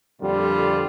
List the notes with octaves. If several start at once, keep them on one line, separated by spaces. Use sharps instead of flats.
F2 A#2 D3 G3 F4